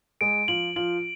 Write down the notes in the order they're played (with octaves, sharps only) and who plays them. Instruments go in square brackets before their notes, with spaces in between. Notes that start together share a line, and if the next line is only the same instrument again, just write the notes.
[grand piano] G#3 G#4 [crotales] D7
[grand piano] F3 F4 [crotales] F#7
[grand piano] F3 F4 [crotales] F#7